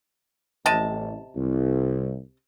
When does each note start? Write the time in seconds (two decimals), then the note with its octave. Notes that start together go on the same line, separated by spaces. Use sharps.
0.66 A1 C3 D#5 A5
1.36 C2